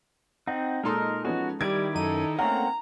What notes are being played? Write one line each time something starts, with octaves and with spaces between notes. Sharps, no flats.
C4 D#4 F#5
A#2 G#3 D#4 A4 A#4 C6 D#6
F3 B3 C#4 F#4
D#3 G3 E4 D5 G#6 D7
F#2 D#4 A4 D#7
A3 A#3 C4 C#4 A#4 F#5 A#5